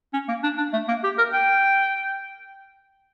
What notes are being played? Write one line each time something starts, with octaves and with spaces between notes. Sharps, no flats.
C#4
A#3
D4
D4
A3
A#3
G4
A#4
G5